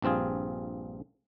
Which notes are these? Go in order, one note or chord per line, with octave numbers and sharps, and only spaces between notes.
A#1 G2 C4 F4 G#4